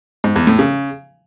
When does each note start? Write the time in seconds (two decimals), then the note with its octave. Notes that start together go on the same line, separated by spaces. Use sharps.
0.24 G#2
0.36 E2
0.47 A2
0.59 C#3